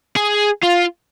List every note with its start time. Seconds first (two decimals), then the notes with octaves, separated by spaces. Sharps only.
0.16 G#4
0.63 F4